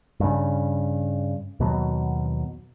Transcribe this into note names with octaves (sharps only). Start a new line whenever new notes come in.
G2 C#3
D#2 B2 F#3